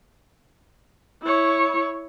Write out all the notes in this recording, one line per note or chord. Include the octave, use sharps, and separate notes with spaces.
E4 C#5